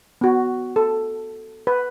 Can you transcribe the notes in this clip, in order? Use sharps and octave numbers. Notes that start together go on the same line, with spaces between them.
B3 F#4
A4
B4